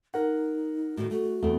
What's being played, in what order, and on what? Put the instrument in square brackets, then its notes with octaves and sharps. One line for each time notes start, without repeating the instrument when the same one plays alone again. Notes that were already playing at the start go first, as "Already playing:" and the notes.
[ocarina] D#4 [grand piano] A#4 F#5
[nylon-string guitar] A2 D#3 [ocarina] F#4
[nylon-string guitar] A3 [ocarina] F#4
[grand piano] E2 [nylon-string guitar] A3 C4